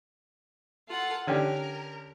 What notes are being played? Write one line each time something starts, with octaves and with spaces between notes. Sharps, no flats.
F4 A4 F#5
D3 C#4 G4 A#4